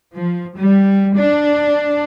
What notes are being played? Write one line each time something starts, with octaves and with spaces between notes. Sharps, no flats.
F3
G3
D4